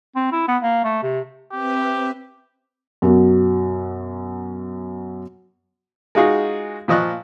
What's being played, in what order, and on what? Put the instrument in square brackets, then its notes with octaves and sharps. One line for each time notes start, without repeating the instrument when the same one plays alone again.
[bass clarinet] C4
E4
B3
A#3
A3
C3
[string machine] C4 B4 E5 [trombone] G4
[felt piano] F#2 B2 F#3
[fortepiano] G#3 D#4 F4 F#4 G#4
A#2 F3 D#5 C#6 F#6